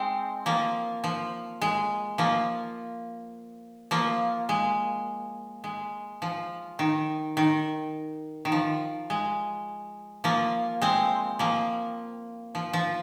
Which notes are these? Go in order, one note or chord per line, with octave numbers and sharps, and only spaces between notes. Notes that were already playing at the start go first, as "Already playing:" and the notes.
Already playing: G#3 C4
F3 A#3
F3
G#3
F3 A#3
F3 A#3
G#3
G#3
F3
D#3
D#3
D#3
F3
G#3
F3 A#3
G#3 C4
F3 A#3
F3
F3